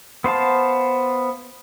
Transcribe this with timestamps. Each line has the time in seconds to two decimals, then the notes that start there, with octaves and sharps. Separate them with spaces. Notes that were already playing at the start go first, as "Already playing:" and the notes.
0.24 B3 C5 F5 A5